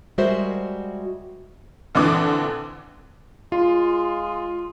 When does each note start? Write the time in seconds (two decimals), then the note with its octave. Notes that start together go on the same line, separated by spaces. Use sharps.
0.18 G3 G#3 F#4 A#4 C5 E5
1.95 A#1 D3 E3 C4 D6
3.52 G#3 F4